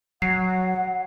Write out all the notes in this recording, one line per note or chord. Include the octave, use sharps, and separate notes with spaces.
F#3 F#5 C7